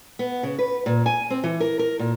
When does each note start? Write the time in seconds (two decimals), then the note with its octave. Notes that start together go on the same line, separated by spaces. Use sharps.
0.19 B3
0.43 C#3
0.59 B4
0.86 A#2
1.06 G#5
1.30 C4
1.44 E3
1.60 A#4
1.79 A#4
1.99 A#2